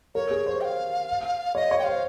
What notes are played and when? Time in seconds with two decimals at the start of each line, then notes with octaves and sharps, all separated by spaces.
0.15 A#4 C#5
0.31 G#4
0.46 C5
0.61 G5
0.65 F5
1.55 C#5 D#5
1.71 C#5
1.79 G5
1.84 C5 F5